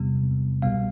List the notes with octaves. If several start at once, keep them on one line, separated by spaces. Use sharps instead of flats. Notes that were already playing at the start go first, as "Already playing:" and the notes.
Already playing: E2 C3 G3 B3
C2 B2 G3 B3 F5